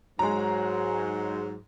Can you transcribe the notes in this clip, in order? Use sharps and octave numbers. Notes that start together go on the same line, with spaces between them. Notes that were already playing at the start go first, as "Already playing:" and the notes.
G#2 F#3 G#3 A#5